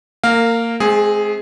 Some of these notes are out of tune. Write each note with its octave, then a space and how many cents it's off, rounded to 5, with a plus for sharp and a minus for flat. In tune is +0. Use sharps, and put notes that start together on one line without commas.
A#3 -20 A#4 -30 F5 +0
G#3 +40 C4 +0 G#4 +0